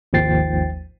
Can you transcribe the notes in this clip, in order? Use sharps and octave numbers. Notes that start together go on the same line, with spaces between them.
G#1 D#2 F3 G5 A6 C7